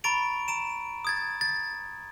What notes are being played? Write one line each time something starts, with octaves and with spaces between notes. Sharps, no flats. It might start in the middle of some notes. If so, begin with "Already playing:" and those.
A#5 B5 C#6 A6 D7 F7
A#5 D7 E7
D#6 G#6 A6
A6